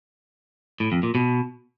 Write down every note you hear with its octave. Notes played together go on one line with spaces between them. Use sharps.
A2
F2
A#2
B2